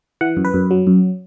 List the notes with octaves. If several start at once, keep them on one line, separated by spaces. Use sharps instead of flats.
E3 F#5
F#2
B4
F#2
F#3
F#2